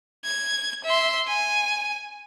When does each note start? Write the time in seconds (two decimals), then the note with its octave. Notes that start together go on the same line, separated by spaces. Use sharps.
0.24 G#6
0.84 E5 C6
1.27 G#5